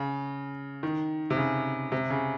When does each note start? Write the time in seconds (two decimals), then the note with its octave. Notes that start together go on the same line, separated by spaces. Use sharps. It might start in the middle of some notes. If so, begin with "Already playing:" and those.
Already playing: C#3
0.83 D#3
1.30 C3
1.37 C#3
1.92 C3
2.10 C#3